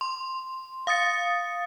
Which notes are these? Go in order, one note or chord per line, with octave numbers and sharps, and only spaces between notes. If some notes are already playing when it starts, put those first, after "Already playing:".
C6
F5 D#6 A6 C#7